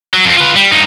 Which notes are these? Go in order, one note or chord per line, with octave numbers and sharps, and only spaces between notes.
F#3
F2 C4
F4 B4
G3
G2 D#4